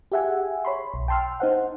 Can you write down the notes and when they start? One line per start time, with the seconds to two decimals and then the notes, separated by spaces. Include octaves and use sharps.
0.12 G4 G#4 E5 F#5 G#5
0.65 C#5 B5 C6
0.94 B1
1.08 G5 A5 C6 E6 F6
1.40 D#4 C5 F#5